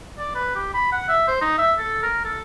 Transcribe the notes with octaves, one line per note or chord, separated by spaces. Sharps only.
D5
B4
G4
B5
F#5
E5
C5
D#4
E5
A4
A#4
A4